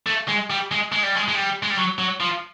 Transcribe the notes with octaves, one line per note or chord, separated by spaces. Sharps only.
A3
G#3
G3
G#3
G#3
G3
G#3
G#3
G3
G#3
G3
F#3
F#3
F3